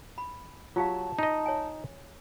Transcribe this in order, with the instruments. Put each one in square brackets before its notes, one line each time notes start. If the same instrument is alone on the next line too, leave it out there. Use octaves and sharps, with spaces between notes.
[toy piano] B5
[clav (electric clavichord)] F#3 [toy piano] F4 G4 F5 [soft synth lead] A5
[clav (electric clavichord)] D#4 D#5
[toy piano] C#5 G#5